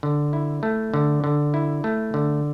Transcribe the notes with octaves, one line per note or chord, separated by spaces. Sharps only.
D3
E4
A3
D3
D3
E4
A3
D3